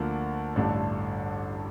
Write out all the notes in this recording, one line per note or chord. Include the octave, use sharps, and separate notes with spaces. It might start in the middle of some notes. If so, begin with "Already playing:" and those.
Already playing: D2 D3 F3 A#3
A1 G2 D3 A3